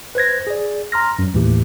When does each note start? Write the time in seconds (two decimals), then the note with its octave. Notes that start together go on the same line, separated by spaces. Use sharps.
0.15 B4 C5 G#6 A#6
0.47 G#4 D5
0.92 A#5 C6 F6 A#6
1.19 F#2
1.34 D#2 A2 E3 A3 G4